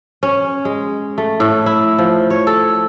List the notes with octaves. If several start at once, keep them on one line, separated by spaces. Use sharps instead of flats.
C#4
G#3
A3
A2
E4
F3
C#5
A4